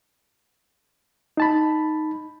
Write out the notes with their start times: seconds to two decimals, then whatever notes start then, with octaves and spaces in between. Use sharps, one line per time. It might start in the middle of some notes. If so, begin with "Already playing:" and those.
1.37 D#4 A5 B5